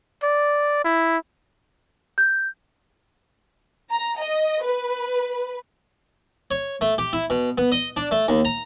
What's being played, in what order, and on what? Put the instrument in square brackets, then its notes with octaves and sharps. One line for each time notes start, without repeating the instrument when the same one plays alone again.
[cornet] D5
E4
[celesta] G6
[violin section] A#5
D#5
B4
[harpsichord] C#5
A3
G4
E4
B2
B3
D#5
D4
A3
D#2
A#5